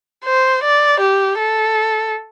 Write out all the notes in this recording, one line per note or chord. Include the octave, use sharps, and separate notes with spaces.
C5
D5
G4
A4